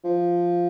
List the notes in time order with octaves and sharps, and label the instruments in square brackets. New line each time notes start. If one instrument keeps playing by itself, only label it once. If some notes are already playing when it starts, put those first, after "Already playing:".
[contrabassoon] F3